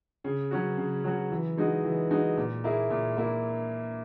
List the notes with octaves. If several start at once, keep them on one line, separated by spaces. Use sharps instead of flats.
C#3
F#3 C#4 F#4
C#3
F#3 C#4 F#4
E3
G#3 D#4 F#4
E3
G#3 D#4 F#4
A#2
A#3 E4 G#4
A#2
A#3 E4